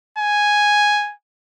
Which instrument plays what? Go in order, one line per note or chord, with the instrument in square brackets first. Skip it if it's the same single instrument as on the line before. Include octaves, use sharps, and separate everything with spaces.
[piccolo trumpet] G#5